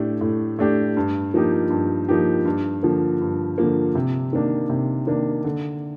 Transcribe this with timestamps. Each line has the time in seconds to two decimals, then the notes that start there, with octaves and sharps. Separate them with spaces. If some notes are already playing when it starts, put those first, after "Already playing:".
Already playing: A2 A3 D4 G4
0.21 A2
0.59 A3 D4 G4
0.97 G2
1.34 F3 A#3 D#4 G4
1.70 G2
2.09 F3 A#3 D#4 G4
2.45 G2
2.83 D3 F3 A#3
3.21 G2
3.58 D3 F3 A#3
3.95 C3
4.33 D#3 A#3 D4
4.70 C3
5.07 D#3 A#3 D4
5.44 D3